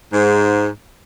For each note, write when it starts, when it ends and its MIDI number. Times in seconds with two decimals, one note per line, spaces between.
0.12 0.68 44